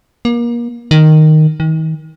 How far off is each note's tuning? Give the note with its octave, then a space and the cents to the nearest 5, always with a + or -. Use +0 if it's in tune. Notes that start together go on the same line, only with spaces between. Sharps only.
A#3 +30
D#3 -5
D#3 +35